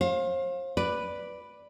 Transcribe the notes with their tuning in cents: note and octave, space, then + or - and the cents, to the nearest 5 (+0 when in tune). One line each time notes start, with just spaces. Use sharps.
C5 +40 F5 +15
B4 +0 D5 +0